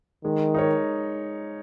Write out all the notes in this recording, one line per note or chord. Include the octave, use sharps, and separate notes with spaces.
D#3 G#3
D#4 A#4 C#5